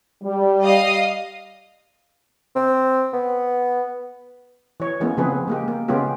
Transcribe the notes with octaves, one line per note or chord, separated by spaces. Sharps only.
G3
D#5 F5 D#6
C4
B3
E3 C#5
E3 G#3 A#3 B3 C#4
C#3 F3 B3 C4 G#4 B4
G#3 A#3 G4
A#3
C#3 G#3 B3 C#4 F4 G4